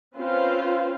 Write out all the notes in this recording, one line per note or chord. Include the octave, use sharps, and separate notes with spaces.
C4 C#4 F4 B4 C5 F5